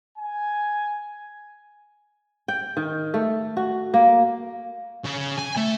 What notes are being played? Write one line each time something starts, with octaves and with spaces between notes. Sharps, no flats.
G#5
G5
D#3
A3
F#4
A#3
C#3
G#5
A3